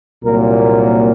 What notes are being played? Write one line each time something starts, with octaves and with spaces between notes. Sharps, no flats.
C2 A#2 F#3 A#3 A#4